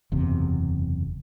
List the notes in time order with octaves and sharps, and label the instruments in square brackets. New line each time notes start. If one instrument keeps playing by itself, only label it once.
[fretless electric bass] F#1 E2 C3